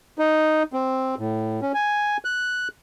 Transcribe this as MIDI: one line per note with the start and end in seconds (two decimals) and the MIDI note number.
0.18 0.63 63
0.73 1.15 60
1.19 1.60 45
1.62 1.72 61
1.74 2.17 80
2.25 2.68 90